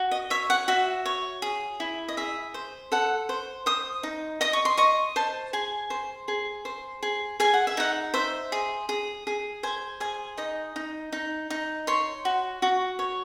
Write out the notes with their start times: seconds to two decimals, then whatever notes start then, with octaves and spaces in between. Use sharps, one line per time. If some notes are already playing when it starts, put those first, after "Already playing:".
Already playing: F#4
0.11 D#5
0.30 C#5 E5
0.50 F#5
0.68 F#4 E5
1.06 C#5
1.42 G#4
1.80 E4
2.09 D#5
2.17 G#4 E5
2.54 C5
2.92 A4 F#5
3.29 C5
3.66 C5 D#6
4.03 D#4
4.41 D#5 D#6
4.53 C#6
4.65 C6
4.78 D#5 C#6
5.16 C5 A5
5.53 G#4 G#5
5.90 C5
6.28 G#4
6.65 C5
7.03 G#4
7.40 G#4 G#5
7.54 F#5
7.67 E5
7.77 D#4 F#5
8.14 C5 E5
8.52 G#4
8.89 G#4
9.27 G#4
9.63 C5 G#5
10.00 G#4 G#5
10.38 D#4 D#5
10.76 D#4
11.12 D#4
11.50 D#4
11.87 C#5 C6
12.25 F#4
12.62 F#4
12.99 C#5